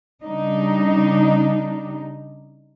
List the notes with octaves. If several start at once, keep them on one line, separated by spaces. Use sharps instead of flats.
C#3 G3 D4 D#4